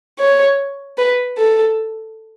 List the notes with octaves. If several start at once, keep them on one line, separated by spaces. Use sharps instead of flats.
C#5
B4
A4